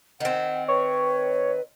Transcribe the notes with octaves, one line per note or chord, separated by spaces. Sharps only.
D#3 C4 F#5
B4 C#5